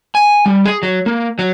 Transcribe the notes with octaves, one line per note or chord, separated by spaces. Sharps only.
G#5
G3
G#4
F#3
A#3
F#3